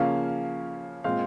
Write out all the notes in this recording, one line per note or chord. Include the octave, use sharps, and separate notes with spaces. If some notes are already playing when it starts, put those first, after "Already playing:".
Already playing: C#3 F3 A#3 C#4 F5
A#2 G#3 C4 F5